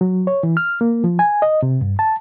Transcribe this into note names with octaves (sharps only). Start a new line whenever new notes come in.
F#3
C#5
E3
F6
A#3
F3
G#5
D#5
C3
G2
A5